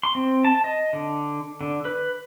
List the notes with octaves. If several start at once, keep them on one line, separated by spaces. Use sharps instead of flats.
C6
C4
A5
D#5
D3
D3
B4